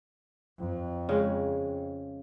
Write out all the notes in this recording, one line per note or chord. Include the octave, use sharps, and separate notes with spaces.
F2
C#3 G#3